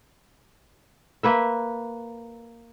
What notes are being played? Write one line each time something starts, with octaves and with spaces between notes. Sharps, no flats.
A#3 B4 E5